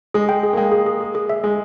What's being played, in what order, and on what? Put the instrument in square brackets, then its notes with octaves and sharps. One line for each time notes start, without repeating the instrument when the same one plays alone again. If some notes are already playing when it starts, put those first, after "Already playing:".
[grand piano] G#3 [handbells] G#4
[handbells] G5
G#4
[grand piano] A#3
[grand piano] G#3 [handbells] G5
[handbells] G#4
G#4
G#4
G#4
E5
[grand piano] G#3 [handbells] G#4